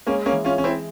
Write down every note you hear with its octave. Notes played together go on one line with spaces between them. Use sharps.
G#3 A#3 C#4
A#3 C#4
E3
C#4 F4
E3 C#4
C4 E4